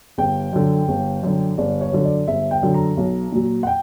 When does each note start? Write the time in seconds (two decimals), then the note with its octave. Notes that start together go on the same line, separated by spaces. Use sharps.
0.18 G1 G5
0.53 F#2 D3
0.88 G1
1.23 F#2 D3
1.58 G1 D5
1.81 C#5
1.93 F#2 D3
2.05 D5
2.28 G1 E5
2.51 G5
2.63 F#2 D3
2.74 A#5
2.97 B1
3.32 A#2 F#3
3.63 F#5
3.67 G5